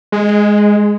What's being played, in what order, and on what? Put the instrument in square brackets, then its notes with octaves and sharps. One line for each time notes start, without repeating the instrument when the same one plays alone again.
[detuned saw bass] G#3